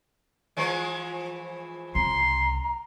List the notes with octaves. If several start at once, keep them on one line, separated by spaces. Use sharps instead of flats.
E3 F3 G#3
C2 C#3 A#5 C6